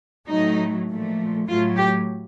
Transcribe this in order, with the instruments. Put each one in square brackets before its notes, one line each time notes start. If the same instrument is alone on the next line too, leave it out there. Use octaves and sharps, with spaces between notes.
[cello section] A2 F#3 A3 D#4
A#2 F3 A3
A2 F#3 A3 F4
G4